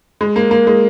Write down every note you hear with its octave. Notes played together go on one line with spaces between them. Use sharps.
G#3
A#3
A#3
G#3